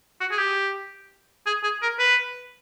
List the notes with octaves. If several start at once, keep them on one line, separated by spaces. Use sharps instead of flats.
F#4
G#4
G4
G#4
G#4
A#4
B4